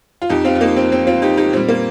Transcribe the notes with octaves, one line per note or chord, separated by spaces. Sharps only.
F4
F2 F3 D#4 G4
C4 F4
F4
A#3 D#4
C4
C4
C4 F4
D#4 G4
D#4 G4
A#2 G3 C4
A#3